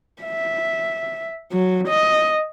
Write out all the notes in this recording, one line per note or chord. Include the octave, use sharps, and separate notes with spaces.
E5
F#3
D#5